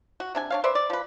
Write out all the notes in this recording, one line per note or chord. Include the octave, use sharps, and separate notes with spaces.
F#4
C3 D4 G#5
D4 C#5 F5
B4 C5 D5 E5
D5
F3 B4